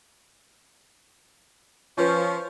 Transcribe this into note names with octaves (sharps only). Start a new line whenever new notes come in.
F3 C#4 F4 B4